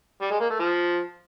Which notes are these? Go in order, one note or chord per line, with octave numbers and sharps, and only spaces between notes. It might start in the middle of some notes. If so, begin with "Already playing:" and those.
G3
G#3
A#3
A3
F3